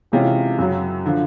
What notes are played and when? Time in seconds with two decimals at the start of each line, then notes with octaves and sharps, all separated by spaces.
0.12 C3 E3 G#3 C#4 F4
0.59 F#2 C#3 F#3
1.06 D3 F3